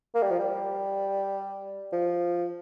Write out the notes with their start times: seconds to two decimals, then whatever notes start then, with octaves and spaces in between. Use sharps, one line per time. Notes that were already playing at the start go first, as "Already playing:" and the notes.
0.15 A#3
0.23 G3
0.31 F3
0.39 G3
1.92 F3